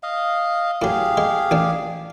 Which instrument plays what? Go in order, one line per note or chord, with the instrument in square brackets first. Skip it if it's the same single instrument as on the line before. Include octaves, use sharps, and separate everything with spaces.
[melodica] D#5 F5
[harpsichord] A2 F#3 [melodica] G4 G#4 F5
[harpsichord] G#3
A1 D4